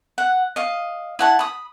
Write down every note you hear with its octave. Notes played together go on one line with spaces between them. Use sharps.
F#5
D#5 F5
E4 F#5 A5
B5 D#6